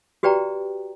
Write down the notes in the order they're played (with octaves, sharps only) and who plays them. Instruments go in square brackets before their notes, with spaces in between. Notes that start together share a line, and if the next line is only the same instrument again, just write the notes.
[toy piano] F#4 G4 B4 D5 G5 A#5